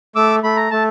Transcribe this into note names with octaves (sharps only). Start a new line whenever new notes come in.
A3 D6 E6
A3 B5
A#5
A3 A5